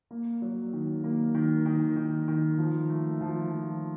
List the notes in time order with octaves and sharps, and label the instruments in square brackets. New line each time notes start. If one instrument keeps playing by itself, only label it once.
[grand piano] A#3
F#3
D#3
A#3
D#3
D#3
D#3
D#3
F3
A3
F3
F3